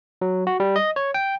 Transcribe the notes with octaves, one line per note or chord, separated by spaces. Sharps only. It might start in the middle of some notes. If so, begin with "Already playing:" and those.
F#3
F#4
G3
D#5
C#5
G5